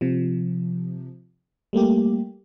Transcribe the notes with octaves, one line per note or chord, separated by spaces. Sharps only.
C3 F3
G3 A3 A#3 G4